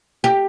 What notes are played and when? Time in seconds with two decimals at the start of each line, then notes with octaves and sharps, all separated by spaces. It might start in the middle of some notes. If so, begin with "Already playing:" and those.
0.24 G4